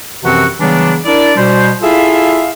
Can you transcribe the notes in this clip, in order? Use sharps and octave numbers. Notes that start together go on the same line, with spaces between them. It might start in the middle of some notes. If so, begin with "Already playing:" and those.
F#2 C3 E3 F3 C4 F#4
C#3 E3 F#3 G3 B3 D4
D4 E4 A#4 D5
B2 G3 C5
E4 F4 G#4 A4 E5 F5